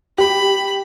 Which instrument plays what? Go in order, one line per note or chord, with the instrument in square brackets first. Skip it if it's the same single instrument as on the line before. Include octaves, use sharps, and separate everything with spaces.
[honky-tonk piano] G4 [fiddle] B5